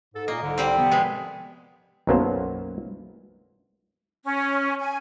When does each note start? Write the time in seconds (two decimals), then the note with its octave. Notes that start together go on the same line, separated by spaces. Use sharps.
0.15 G#2 A4
0.28 A#2 A#3 D#5
0.42 C2 G#2 D3
0.58 G3 C4
0.77 C3 F3 B3
0.92 B2 G#3
2.07 B1 F#2 F#3 A#3 B3 C5
4.24 C#4
4.78 G#5